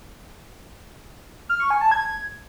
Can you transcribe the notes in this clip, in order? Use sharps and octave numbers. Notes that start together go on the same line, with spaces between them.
F6
C#6
G#5
A5
G#6